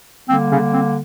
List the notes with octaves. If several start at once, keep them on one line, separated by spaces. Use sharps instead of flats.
D3 G3 A#3 C4
C#3 C#4
C4